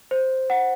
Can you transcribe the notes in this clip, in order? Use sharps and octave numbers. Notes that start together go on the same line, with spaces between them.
C5
F#5